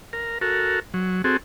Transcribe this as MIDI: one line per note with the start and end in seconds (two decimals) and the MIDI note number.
0.13 0.38 70
0.41 0.80 66
0.41 0.80 69
0.41 0.80 70
0.94 1.22 54
1.24 1.37 60
1.24 1.37 66
1.24 1.37 68
1.24 1.37 69